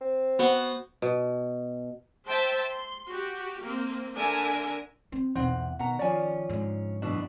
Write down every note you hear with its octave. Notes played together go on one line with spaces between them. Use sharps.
C4
B3 F#4 C5
B2
C5 E5 G5 A5
C6
F#4 G4
A#3 C4
D3 D4 A#4 E5 G#5
C4
B1 E2 B2 C4 F#5
B2 D#3 F#5 A#5
F3 C#4 D5 G#5
G#2 D3
F#2 B2 E3 D4